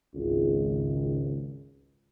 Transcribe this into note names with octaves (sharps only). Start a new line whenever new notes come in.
G#1 C#2